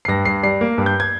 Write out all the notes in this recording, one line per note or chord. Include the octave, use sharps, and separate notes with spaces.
C7
G2 A#6
G2 C7
G3 C7
A#3
G2
G6
G#6